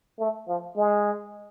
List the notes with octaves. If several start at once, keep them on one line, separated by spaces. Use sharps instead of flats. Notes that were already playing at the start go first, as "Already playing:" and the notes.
A3
F3
G#3